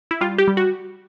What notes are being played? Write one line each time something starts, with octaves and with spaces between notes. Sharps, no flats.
E4
G3 F4
G4
G3
F#4